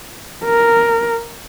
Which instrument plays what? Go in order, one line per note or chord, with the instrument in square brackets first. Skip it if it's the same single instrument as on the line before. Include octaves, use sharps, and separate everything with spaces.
[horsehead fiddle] A#4